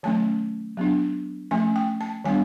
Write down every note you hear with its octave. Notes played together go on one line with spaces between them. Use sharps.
D#3 F#3 A3 C#4 A5
F#3 B3 D4
F3 A3 C#4 G#5
G5
A5
D#3 G3 B3 D4 G#5